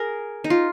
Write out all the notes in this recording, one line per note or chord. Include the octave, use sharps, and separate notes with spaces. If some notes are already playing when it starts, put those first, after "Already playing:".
Already playing: G#4 A#4
D#4
F4